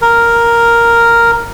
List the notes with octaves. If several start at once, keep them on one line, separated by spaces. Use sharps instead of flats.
A#4